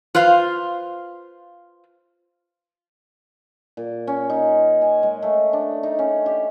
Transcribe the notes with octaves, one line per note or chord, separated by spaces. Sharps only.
F4 B4 C5 F5
A#2
C#4
D#4
G#5
G#3
A3
D4
D#4
C#4
G4